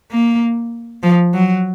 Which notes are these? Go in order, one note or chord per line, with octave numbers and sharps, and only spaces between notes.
A#3
F3
F#3